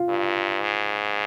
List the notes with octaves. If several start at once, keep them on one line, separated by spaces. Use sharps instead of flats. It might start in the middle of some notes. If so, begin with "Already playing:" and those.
Already playing: F4
G2
G#2